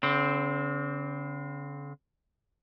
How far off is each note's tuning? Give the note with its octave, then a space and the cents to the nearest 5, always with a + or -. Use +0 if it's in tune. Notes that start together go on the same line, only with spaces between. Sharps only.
D3 -45 C4 +0